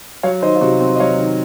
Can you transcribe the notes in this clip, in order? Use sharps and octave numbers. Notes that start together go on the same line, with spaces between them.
F#3 C#5 F5
D#3 C5 D#5
F4
C3 F#4
C4
D#5
F#3 C#5 F5
D#3